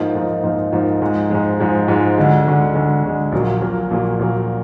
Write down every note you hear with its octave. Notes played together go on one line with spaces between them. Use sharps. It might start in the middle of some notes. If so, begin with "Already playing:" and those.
Already playing: G#2 F3 A#3 D#4
G#2 F3 A#3 D#4
G#2 F3 A#3 D#4
G#2 F3 A#3 D#4
G#2 F3 G#3
G#2 F3 G#3
G#2 F3 G#3
G#2 F3 G#3
D2 D3 G#3
D2 D3 G#3
D2 D3 G#3
D2 D3 G#3
A#1 A#2 F#3 A#3
A#1 A#2 F#3 A#3
A#1 A#2 F#3 A#3
A#1 A#2 F#3 A#3